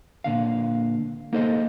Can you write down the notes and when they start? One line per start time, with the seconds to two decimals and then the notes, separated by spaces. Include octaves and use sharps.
0.24 A#2 D3 F5
1.33 A#3 D#4 A4 C5 C#5 D#5